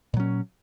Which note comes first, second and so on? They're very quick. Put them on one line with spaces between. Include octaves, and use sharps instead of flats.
A#2 F#3 C#4